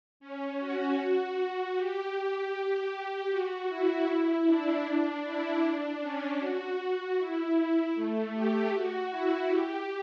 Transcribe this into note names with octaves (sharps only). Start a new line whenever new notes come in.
C#4
F#4
F#4
G4
G4
F#4
E4
D4
D4
E4
D4
C#4
F#4
F#4
E4
A3
G4
F#4
E4
G4